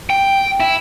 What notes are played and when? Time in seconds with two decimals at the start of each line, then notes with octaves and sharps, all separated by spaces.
0.10 G5
0.60 E4